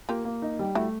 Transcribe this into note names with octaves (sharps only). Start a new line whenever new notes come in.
A#3 F4 G4
A#3
D#4
G3
A3 E4 F#4